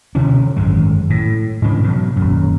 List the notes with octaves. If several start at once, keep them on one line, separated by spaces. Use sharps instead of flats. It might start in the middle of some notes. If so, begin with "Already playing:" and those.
D2 B2 D3 C#4
G#1 F#2 G#3
A2
G#2 C#3 E3 D4
B2 F#3
D#1 F#2